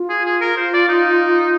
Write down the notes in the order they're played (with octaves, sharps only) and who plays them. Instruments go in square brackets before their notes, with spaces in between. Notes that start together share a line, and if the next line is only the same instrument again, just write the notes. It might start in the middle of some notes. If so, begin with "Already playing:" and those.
Already playing: [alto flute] F4
[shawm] G#4
G#4
A#4
C5
D5
D#4